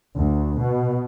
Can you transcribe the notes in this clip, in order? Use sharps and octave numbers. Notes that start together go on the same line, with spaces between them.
D2
B2